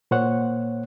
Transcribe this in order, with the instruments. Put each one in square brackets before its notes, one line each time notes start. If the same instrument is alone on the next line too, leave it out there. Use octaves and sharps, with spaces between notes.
[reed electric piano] A#2 A#3 C5 C#5 F#5